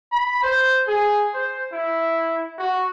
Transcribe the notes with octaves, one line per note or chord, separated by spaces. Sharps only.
B5
C5
G#4
C5
E4
F#4